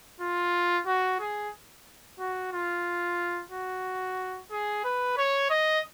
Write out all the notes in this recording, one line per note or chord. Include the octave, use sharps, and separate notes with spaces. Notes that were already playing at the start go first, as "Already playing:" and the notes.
F4
F#4
G#4
F#4
F4
F#4
G#4
B4
C#5
D#5